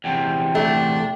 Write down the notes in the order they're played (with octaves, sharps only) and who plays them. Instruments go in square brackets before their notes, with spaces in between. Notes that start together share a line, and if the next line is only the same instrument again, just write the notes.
[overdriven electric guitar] E2 C3 [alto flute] G5
[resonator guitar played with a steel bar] A3 [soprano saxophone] D4